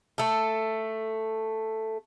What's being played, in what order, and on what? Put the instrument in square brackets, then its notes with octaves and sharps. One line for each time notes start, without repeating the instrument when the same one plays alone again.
[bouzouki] A3 A4